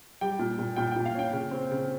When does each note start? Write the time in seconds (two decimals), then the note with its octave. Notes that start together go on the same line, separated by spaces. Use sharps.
0.21 G3 G5
0.39 A#2
0.59 A#2
0.76 A#2 G5
0.92 A#2 G5
1.06 F5
1.14 C#4 G5
1.33 C#3
1.51 C4
1.71 C#3